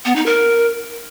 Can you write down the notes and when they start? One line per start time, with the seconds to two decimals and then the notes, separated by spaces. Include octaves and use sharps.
0.05 B3
0.16 D#4
0.26 A#4